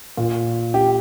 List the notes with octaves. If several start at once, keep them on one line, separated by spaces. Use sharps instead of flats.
A#2
G4